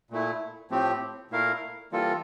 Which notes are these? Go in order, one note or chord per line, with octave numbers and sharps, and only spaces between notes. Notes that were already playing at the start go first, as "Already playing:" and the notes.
A#2 A3 E4
A2 F3 A3 C4 G4
A#2 A3 E4 A#4 F5
E3 G3 A#3 F4 A4